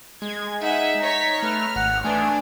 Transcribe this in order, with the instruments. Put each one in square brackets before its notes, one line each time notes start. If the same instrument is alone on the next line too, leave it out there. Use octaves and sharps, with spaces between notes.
[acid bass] G#3 [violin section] G#6
[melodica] D#4 [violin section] E5 F#5 G#5
[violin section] C#5 B6 [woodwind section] A#5
[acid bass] A3 [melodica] B4 [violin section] F6
[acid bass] G#1 [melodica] F#5
[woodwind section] E3 G#3 [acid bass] A3 [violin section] D4 [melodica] G#5